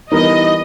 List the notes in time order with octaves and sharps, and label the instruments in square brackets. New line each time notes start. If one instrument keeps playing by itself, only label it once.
[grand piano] E3 G3 B3 D#4 A#4 [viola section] D#5